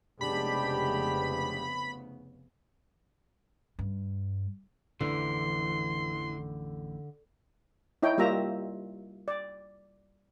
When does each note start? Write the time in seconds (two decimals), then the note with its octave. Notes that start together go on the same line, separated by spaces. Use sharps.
0.21 F1 C#3 G#3 B3 D4 G4 B5
3.79 G2
5.01 A1 F2 D3 E3 C6
8.03 D#4 E4 C#5 G5
8.18 G3 A#3 F4 E5 A#5
9.28 D5